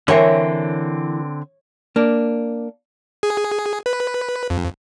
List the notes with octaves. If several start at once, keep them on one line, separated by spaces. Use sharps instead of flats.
D3 E3 C4 A#4 C#5 E5 G#5
A#3 D4
G#4
B4
F2